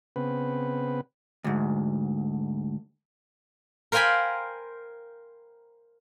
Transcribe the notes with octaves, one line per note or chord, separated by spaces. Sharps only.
C#3 B3 C4 B4
D2 G#2
A#4 C5 F5 G5 G#5 B5